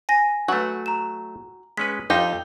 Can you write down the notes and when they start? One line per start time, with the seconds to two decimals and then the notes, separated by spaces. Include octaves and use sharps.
0.09 G#5 A#6
0.48 F#3 A3 F#4 B4
0.86 A#5 E7
1.77 G#3 C#4 B4 B6
2.10 F2 D#4 F4 G4 A4